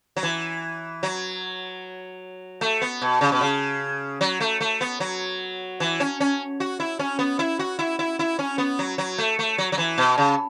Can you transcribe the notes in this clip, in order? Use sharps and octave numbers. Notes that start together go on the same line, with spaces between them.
F#3
E3
F#3
A3
B3
B2
C#3
B2
C#3
F#3
A3
A3
B3
F#3
E3
C#4
C#4
F#4
E4
C#4
B3
E4
F#4
E4
E4
E4
C#4
B3
F#3
F#3
A3
A3
F#3
F#3
E3
B2
C#3